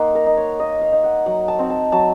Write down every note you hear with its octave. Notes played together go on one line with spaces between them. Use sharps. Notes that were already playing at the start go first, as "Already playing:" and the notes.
Already playing: A#3 D#4 F#5 C6
A#4
D#4
C#5
A#3 D#5
F5
D#4
F#5
F#3 F#5
A5
C4 D#4
A5
F#3 A5